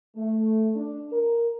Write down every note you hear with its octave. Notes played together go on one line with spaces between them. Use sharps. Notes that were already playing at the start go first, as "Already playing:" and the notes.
A3
D4
A#4